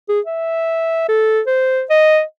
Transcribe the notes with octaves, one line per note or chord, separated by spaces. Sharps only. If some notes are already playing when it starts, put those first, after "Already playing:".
G#4
E5
A4
C5
D#5